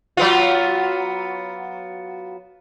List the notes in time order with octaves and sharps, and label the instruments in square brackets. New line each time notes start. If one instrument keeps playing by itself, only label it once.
[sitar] F#3 B3 F4